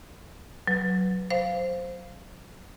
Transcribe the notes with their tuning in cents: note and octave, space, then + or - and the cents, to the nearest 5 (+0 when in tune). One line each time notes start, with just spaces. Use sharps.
F#3 +0 B4 +0
C5 +0 F5 +0